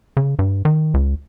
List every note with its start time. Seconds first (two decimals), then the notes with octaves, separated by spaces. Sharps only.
0.17 C#3
0.39 G2
0.65 D#3
0.94 C#2